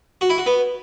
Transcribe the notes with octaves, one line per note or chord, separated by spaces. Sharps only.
F#4
E4
F#4
B3